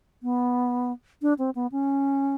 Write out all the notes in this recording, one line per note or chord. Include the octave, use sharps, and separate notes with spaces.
B3
D4
C4
B3
C#4